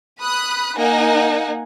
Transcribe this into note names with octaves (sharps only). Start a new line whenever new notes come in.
B5 D#6 F#6
A#3 D#4 F#5 G#5